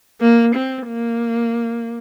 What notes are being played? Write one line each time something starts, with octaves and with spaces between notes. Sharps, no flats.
A#3
C4
A#3